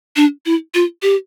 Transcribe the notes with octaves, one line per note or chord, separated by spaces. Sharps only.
D4
E4
F4
G4